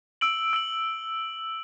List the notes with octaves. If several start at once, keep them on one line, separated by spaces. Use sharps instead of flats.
E6 D7 F#7
E6 D7 F#7